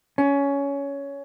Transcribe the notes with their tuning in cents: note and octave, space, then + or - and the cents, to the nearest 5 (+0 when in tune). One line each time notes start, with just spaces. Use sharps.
C#4 +15